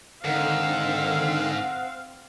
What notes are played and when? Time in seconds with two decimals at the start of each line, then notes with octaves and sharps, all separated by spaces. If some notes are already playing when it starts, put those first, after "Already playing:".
0.24 G#2 D3 D#3 C4 F5 F#5